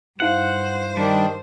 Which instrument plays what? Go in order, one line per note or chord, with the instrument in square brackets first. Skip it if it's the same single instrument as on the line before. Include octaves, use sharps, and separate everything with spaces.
[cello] G2 C5 [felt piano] D#4 E4 F5 [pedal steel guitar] F#5
[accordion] D#3 D4 [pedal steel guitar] G3